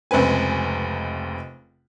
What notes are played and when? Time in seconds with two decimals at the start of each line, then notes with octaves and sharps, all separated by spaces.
0.11 F1 C#2 C4 B4 G#5